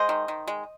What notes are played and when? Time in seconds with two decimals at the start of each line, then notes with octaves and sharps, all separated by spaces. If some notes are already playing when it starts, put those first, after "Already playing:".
Already playing: G#3 C5 D#5
0.09 D#3
0.28 D#3
0.48 G#3